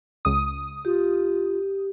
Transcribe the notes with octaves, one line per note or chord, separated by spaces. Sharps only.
C#2 D#6
F4 G4